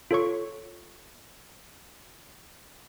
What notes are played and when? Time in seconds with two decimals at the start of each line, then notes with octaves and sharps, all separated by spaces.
0.11 F4 A4 C#5 C#6